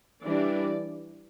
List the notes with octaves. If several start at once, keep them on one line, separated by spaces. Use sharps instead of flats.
E3 G3 D4 D5